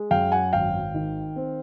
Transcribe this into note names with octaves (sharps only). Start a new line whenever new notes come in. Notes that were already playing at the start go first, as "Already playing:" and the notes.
Already playing: G#3
F#2 F5 G5
F#5 G#5
G#1 F5 G5
D#3
C4